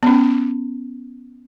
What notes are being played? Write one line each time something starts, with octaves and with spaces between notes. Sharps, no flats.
B3 C#4